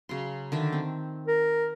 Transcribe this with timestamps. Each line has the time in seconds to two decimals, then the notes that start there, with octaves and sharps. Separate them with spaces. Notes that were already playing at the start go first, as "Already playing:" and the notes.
0.09 C#3 F#3 C6
0.52 D3 D#3 E5
0.73 C4
1.28 A#4